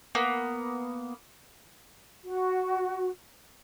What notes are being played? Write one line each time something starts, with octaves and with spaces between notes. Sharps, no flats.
A#3 B3
F#4